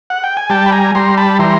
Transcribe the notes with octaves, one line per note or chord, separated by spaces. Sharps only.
F#5
G5
G#5
G3 G5 A5
B5
G#5 A#5
G3 A#5 C6
A5 B5
E3 A#5 C6